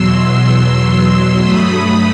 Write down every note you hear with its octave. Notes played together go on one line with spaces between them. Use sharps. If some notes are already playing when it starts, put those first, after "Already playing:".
Already playing: E2 B2 F#3 C6 E6
G2 F#3 A3 B5 D#6